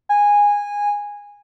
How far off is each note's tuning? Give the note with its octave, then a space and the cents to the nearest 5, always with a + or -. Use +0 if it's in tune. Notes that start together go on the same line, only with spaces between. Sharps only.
G#5 -15